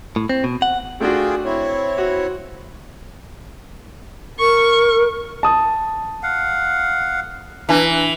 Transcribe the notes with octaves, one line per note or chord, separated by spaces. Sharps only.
A2
C4
B2
F#5
A3 D4 F4 F#4 G#4 G5
C4 E4 C#5
F#4
A#4 C#6
A5 D#6
F5 F#5
E3 D4 B4 A5 A#5